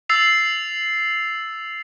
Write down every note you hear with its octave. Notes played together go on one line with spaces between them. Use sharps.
E6 A6 C7 F7